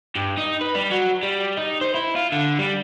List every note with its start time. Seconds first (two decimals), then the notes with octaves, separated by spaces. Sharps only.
0.16 G2
0.38 D#4
0.61 B4
0.75 G3
0.91 F#3
1.23 G3
1.57 D#4
1.81 C5
1.94 E4
2.15 F4
2.32 D3
2.59 G3